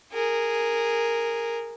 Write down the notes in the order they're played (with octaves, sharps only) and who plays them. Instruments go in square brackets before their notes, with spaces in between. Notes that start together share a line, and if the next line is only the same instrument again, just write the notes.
[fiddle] G#4 A#4